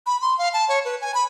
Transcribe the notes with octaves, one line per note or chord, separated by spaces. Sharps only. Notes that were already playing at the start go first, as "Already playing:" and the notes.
B5
C6
F5
A5
C#5
B4
G#5
B5